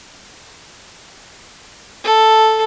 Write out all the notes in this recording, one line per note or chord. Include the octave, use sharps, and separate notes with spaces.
A4